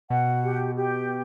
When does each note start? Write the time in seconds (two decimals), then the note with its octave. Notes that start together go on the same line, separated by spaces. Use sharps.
0.10 B2 F#5
0.44 G4
0.75 G4